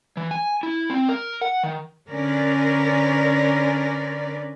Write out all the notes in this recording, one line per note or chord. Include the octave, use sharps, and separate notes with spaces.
E3
G#5
E4
C4
A#4
F#5
D#3
D3 C#4 A#4 B4 D5